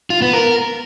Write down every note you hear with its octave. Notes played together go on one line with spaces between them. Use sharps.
F4
B3
A#4